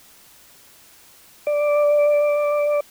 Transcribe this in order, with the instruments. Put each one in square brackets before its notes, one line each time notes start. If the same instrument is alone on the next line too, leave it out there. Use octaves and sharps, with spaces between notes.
[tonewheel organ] D5